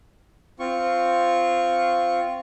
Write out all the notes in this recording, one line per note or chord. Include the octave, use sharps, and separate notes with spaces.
C4 F4 C#6